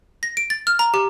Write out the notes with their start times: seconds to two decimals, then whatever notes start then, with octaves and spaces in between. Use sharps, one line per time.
0.23 A#6
0.37 D7
0.50 A6
0.67 F6
0.79 A#5
0.94 G4